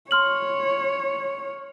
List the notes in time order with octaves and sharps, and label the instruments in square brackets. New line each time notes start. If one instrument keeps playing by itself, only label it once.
[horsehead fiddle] C#5 [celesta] C6 F6 F#7